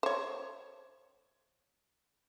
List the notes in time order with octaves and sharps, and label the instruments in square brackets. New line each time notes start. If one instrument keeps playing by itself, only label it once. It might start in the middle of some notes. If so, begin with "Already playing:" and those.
[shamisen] C5 C#5